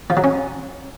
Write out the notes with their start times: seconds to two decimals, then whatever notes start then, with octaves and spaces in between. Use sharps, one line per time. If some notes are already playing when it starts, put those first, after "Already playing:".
0.10 F3
0.17 F#3
0.24 C#4